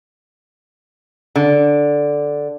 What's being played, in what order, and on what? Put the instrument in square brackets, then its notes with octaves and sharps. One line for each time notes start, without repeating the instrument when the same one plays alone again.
[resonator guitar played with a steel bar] D3